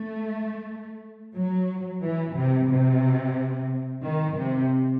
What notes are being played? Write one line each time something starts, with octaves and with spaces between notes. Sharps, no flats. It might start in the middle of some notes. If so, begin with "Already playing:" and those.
Already playing: A3
F#3
E3
C3
C3
D#3
C3